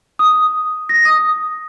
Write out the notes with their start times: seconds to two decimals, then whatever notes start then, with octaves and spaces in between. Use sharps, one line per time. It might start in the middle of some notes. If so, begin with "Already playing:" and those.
0.19 D#6
0.89 A#6
1.05 D#6